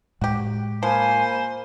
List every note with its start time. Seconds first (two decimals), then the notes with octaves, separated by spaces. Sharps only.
0.21 A2 G#3 F#4 G4
0.83 F3 A#3 C5 G#5 B5